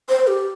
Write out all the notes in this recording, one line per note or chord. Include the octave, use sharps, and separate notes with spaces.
C5
G4